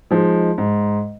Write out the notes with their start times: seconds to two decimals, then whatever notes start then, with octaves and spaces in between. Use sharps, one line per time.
0.11 F3 G#3 D#4
0.58 G#2